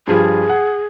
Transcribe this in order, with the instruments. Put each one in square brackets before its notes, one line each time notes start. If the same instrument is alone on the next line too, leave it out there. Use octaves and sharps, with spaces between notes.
[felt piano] G2 F3 G3 [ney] G#4
[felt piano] F#5